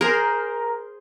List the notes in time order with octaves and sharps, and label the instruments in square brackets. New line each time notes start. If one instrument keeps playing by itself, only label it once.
[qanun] G#4 C5 [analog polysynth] A#4